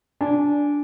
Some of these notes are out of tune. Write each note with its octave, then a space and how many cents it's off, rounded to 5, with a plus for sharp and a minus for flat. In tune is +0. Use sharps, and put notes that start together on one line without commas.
D4 -10 G#5 +0